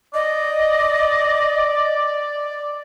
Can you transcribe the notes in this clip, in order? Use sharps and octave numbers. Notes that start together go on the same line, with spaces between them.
D5 D#5